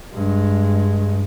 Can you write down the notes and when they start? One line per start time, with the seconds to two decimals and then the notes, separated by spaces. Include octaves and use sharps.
0.13 G2 G#3